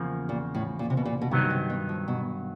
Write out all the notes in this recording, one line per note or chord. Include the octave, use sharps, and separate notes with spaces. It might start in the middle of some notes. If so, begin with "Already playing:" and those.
Already playing: E2 C#3 F3 A#3
A#2
A2
A#2
C3
B2
A#2
B2
G2 C3 D#3 F#3 B3 D#4
C3
B2
F3
B2